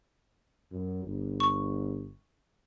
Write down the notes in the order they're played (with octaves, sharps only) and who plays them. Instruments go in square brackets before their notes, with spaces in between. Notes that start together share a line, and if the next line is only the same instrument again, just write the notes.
[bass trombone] F#2
G1
[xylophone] C#6